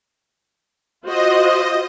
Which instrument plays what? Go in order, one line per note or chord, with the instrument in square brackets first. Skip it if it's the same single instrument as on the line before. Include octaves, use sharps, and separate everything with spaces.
[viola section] F4 F#4 C5 [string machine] D#5